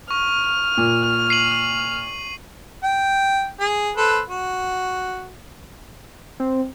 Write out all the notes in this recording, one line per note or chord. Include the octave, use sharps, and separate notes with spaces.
C#6 F6
A#2
C7 D#7 F#7
G5
G#4
A4 B4 C5
F#4
C4